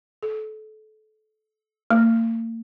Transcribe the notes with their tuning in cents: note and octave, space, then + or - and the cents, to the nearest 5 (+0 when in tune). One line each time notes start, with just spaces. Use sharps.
A4 -30
A#3 -40